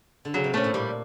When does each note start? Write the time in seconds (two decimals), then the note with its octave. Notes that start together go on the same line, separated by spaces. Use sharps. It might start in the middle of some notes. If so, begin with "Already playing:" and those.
0.25 D3
0.34 C#3 F#3
0.44 C3
0.54 A#2 A3 C#4
0.64 A2
0.74 A#2 G3